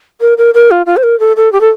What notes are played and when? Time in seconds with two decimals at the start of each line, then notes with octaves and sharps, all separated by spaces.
0.21 A#4
0.38 A#4
0.54 A#4
0.71 F4
0.86 F4
0.97 C5
1.03 A#4
1.20 A4
1.36 A4
1.53 G4
1.61 A4